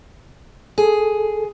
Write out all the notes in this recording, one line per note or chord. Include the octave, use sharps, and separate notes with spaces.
G#4 A4